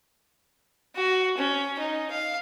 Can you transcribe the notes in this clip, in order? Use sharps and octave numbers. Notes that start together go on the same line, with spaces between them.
F#4
C#4
D#4
F5